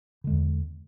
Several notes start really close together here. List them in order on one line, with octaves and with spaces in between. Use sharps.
D3 G#3 E2